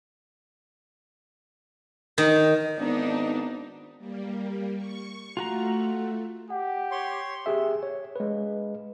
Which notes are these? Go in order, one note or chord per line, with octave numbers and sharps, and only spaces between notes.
D#3
G#1 B3 D4 D#4
G3 A#3
C#6
A3 F4 F#4 A#5
G4 F#5
C#5 C6
G4 G#4 E5
C#5
G#3 B4